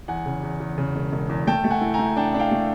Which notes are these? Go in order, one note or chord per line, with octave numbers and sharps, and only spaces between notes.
E2 F#5 G#5
C#3
E2
E2
C#3
E1
E1
E2
A3 G5 A5
A3
F#5 G#5
A2
G#5 A#5
A2
D4 G5 A5
D4
F5 G5
A3